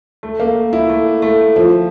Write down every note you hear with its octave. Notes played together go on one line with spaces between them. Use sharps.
A3
A#3
E4
A3
A3
F3